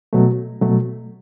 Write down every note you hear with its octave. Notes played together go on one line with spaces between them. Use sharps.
B2 F#3 A3
B2 F#3 A3